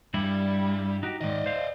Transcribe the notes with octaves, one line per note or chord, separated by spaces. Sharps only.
G2 G3 E4
D#4 F#4 G4
G#2 D#3 D5 D#5
C5 F5